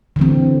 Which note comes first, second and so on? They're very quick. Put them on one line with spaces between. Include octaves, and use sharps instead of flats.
D3 E3 C4